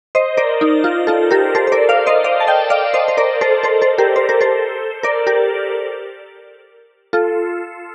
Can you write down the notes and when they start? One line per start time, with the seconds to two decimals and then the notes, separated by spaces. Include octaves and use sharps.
0.15 C5 D#5
0.37 A#4 D5
0.61 D#4
0.84 F4
1.07 F4 A4
1.31 G4 A#4
1.55 A4 C5
1.67 C5
1.72 A#4 D5
1.89 D5 F5
2.07 C5 D#5
2.24 D5 F5
2.40 A5
2.47 D#5 G5
2.70 D5 F5
2.94 C5 D#5
3.08 C5
3.17 A#4 D5
3.41 A4 C5
3.63 A4 C5
3.82 A4 C5
3.98 G4 A#4
4.16 C5
4.29 A#4
4.41 A4 C5
5.03 A#4 D5
5.27 G4 A#4
7.13 F4 A4